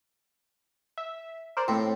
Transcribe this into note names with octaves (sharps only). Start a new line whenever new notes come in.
E5
A#4 C5 D5
A2 C4